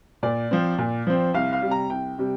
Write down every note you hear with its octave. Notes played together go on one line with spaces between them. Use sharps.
A#2 D5
F3 C4
A#2
F3 C4
C2 F5
F5
C3 G3
A#5
C2 G5
C3 G3